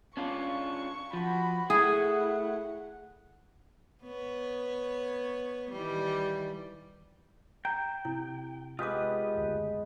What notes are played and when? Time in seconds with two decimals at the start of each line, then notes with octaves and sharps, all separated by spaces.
0.17 C#4 D4 F4 C#6
1.13 F3 F#4 B5
1.70 A3 E4 G#4 F#5
4.03 B3 C#5
5.71 D#3 E3 G3
7.65 G5 A#5
8.05 C3 E4
8.79 G#3 B3 F4 G4 B4 D#5 D6 D#6
9.35 F#1 D2